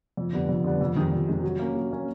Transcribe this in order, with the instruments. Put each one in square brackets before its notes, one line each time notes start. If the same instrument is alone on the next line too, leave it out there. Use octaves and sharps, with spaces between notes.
[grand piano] F2
D3 G3 B3
F2
D3 G3 B3
F2
C3 D#3 G#3
F2
C3 D#3 G#3
F#3
A#3 C#4
F#3
A#3 C#4